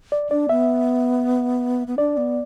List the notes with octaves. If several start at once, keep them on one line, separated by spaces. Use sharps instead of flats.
D5
D4 D5
B3 E5
B3
D4 D5
B3